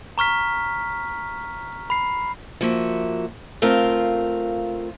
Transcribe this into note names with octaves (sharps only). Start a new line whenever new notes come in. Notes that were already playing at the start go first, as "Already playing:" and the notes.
A#5 C#6 F6 B6
B5 C7
F3 A#3 F#4 E5
A3 C4 F4 A#4 F5